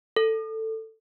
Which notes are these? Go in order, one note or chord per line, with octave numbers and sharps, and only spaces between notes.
A4